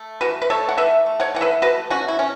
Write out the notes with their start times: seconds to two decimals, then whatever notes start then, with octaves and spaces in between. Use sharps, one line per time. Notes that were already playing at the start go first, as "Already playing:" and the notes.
Already playing: A3
0.21 E3 F#4 B4
0.42 B4
0.50 A3 A4 C#5
0.69 F#5
0.78 E3 B4 E5
1.06 A3
1.20 C#5 F#5
1.35 E3 F#5
1.41 B4 E5
1.62 A3 F#4 B4
1.90 B2 C#4 F#4
2.08 E4
2.19 A3 C#4